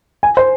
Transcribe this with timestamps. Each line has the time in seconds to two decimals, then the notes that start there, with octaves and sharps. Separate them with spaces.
0.23 G#5
0.37 C5